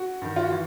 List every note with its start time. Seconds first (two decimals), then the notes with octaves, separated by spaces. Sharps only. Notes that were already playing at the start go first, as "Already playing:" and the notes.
Already playing: F#4
0.22 G2 D#3
0.36 F4
0.43 F#4
0.50 E3